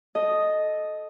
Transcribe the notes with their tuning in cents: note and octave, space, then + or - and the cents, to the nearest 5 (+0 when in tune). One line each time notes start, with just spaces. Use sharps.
A4 -15 D#5 +0